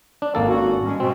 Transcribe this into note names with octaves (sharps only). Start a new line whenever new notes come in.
D4
G#1 A#3 A4
C#4 F4 F#4
G3 G#3 C#4
B2 C4